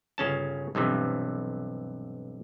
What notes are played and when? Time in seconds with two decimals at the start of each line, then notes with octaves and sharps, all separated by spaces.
0.18 G1 C#3 C#4 A5
0.75 B1 G2 C3 E3